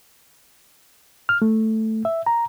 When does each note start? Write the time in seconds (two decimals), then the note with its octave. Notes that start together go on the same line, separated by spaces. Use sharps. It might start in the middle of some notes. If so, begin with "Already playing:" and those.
1.29 F6
1.42 A3
2.05 E5
2.26 A#5